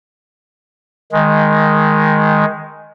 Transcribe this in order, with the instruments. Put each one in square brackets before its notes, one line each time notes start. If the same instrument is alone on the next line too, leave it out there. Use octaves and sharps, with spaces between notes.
[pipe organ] D#3 G#3